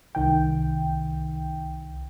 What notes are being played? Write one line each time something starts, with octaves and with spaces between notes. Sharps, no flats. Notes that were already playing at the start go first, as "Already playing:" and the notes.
C2 D#3 G5